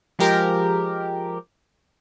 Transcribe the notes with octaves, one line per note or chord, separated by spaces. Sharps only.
F3 G#3 G4 A#4